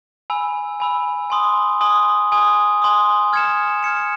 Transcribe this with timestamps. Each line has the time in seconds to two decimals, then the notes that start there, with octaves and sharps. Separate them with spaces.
0.30 G#5 B5 E6
0.80 G#5 B5 E6
1.30 G#5 C6 D#6
1.81 G#5 C6 D#6
2.32 G#5 C6 D#6
2.82 G#5 C6 D#6
3.33 F6 G#6 C#7 E7
3.83 F6 G#6 C#7 E7